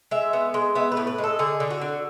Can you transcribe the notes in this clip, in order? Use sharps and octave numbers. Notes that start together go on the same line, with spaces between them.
G#3 E5
B3
G#3
B3 E5
B4
A2
B4
G#3
A4
D3 G#4
D3
F#4
D3